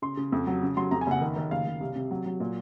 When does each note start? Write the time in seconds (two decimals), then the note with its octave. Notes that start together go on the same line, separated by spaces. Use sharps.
0.02 C#3 C6
0.17 C#3
0.32 F2
0.47 F#3
0.62 C#3
0.76 F#3 C6
0.91 F2 A#5
1.01 G#5
1.07 F#1 F#5
1.21 D#3
1.36 D#3
1.51 F#1 F5
1.66 F#1
1.81 C2
1.96 C3
2.11 F#3
2.26 F#3
2.40 A#2